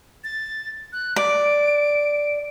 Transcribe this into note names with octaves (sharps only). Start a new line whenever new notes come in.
A6
F#6
D5 D7